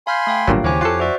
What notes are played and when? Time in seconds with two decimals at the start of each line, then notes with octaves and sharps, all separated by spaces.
0.07 F5 G#5 B5 C6 F6 G6
0.27 A3 F5 G5
0.48 G#1 G2 A#2 F#3
0.64 D#2 C#3 E4 G4 C5 C#5 G#5
0.81 F2 F4 A4 D6 F#6 C7
1.00 F#4 C5 D5 E5